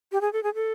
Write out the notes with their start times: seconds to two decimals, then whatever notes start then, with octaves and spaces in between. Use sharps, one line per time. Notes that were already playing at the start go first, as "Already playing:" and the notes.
0.12 G4
0.21 G#4
0.33 A4
0.43 G#4
0.55 A4